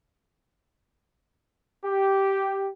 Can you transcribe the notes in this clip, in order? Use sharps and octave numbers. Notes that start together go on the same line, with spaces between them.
G4